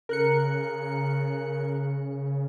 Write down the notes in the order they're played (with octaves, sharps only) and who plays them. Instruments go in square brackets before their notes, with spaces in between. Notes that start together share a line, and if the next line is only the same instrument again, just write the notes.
[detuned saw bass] C#3 [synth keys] A#4 F#6 C#7